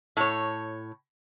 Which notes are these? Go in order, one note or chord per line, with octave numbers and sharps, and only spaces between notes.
A2 C#5